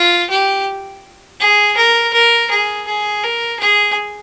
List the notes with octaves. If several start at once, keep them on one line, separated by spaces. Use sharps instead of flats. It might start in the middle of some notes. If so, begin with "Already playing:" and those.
Already playing: F4
G4
G#4
A#4
A#4
G#4
G#4
A#4
G#4